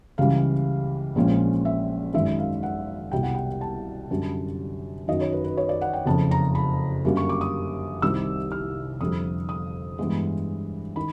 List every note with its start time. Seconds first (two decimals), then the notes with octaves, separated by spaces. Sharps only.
0.18 C#2 C#3 E3 G3 F5
1.15 A#1 A#2 F3 G#3 C#4
1.65 E5
2.14 G#1 F#2 D#3 G#3 E5
2.39 F5
2.63 F#5
3.12 C2 B2 G3 G5
3.23 F#5
3.35 G5
3.61 A5
4.11 F#2 D3 G3
5.08 F#2 D#3 F#3 D#5
5.21 C#5
5.33 B4
5.44 B4
5.57 C#5
5.69 D5
5.81 F#5
5.93 G5
6.06 F#1 F2 C#3 A5
6.31 A#5
6.55 B5
7.05 F#2 D3 G3 A#3
7.17 C#6
7.29 D6
7.41 D#6
8.02 C2 C3 D#3 G3 E6
8.52 F6
9.01 F2 D3 G3 D#6
9.49 D#6
9.98 G2 E3 G#3 B3
10.96 D#3 B5